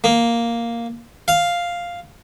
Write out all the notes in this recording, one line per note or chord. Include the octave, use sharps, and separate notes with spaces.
A#3
F5